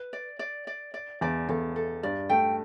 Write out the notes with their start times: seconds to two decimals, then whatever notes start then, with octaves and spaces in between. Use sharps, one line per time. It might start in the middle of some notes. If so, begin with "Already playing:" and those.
Already playing: B4
0.13 D5
0.39 D5
0.67 D5
0.94 D5
1.21 E2 D5
1.49 E2 A4
1.76 A4
2.03 G2 D5
2.30 A3 G5